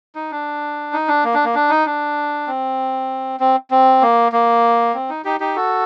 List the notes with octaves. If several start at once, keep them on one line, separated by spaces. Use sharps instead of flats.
D#4
D4
D#4
D4
A#3
D4
A#3
D4
D#4
D4
C4
C4
C4
A#3
A#3
C4
D#4
D#4 G4
D#4 G4
F#4 A4